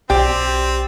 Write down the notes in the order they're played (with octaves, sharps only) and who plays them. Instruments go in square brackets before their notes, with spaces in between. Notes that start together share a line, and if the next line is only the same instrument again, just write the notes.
[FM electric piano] B1 D5 A6 [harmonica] C4 [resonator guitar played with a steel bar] G4 [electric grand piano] G5